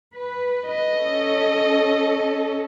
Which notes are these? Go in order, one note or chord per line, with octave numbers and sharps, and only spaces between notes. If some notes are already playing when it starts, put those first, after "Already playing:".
B4
D#5
C#4 A4